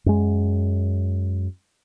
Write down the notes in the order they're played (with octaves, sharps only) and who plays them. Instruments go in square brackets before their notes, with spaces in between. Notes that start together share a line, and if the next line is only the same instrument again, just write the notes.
[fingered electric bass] F#2 G#3